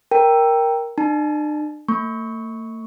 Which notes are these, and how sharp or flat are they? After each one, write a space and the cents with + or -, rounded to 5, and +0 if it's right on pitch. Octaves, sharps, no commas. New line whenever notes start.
A#4 +5 G5 +0
D4 +45 A5 +15
A3 +45 C#6 +0